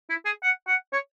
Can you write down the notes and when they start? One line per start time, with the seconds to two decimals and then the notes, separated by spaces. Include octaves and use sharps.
0.10 E4
0.25 G#4
0.43 F#5
0.68 F#5
0.93 C#5